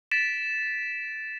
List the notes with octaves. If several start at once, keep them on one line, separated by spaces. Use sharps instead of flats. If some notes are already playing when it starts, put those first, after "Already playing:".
A6 B6 D7 E7